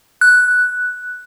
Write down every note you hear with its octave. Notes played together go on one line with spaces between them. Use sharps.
F#6